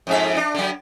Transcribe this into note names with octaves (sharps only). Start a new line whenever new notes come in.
F2 G#2 E5
D4
D3 F#3